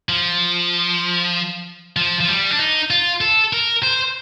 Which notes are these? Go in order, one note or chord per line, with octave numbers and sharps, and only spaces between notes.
F3
F3
F3
G3
D4
D#4
F4
A4
A#4
C5